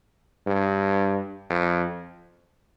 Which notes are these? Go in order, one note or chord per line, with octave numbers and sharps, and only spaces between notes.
G2
F2